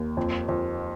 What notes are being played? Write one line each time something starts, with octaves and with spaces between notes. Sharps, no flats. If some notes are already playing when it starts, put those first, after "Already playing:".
Already playing: D#2
F2
F2